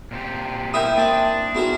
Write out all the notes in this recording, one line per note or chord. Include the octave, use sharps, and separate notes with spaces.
A#2 C4 G4
E4 A#4 E5 G5 D#6
A#3 C4 D4 E5
G#2 B3 E4 F#4 A#4